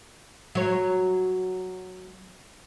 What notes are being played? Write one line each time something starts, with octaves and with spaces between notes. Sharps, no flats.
F#3 C#5